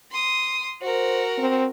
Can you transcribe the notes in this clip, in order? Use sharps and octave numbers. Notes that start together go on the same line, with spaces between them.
C6 D#6
F#4 A#4 C5
C4